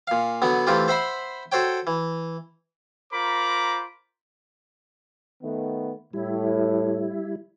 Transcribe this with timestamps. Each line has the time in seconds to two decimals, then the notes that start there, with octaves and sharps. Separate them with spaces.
0.07 A#2 F5
0.42 D3 F#3 B3
0.67 E3 A3 C4 F4 G4
0.88 C5 E5 F#5 B5 C6
1.52 F#4 A4 C5 C#5 G5
1.87 E3
3.13 F4 A#4 C5 A#5 B5 D6
5.43 D#3 A3 B3
6.13 A2 G3 E4